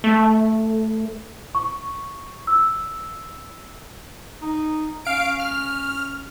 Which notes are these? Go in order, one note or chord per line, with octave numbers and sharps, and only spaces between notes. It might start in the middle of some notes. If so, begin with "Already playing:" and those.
A3
C#6
E6
D#4
C#4 F5 D7
F6